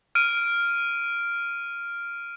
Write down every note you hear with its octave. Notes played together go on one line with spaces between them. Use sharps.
F6 D7 D#7